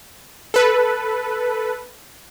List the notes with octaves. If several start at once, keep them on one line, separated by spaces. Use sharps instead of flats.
A4 B4